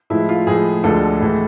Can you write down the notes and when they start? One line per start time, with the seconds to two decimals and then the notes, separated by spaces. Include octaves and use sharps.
0.10 A2 F3 G#3 E4
0.29 F4
0.47 A2 F3 G#3 G#4
0.84 D2 D3 F3 G#3 A4
1.20 A2 E3 G#3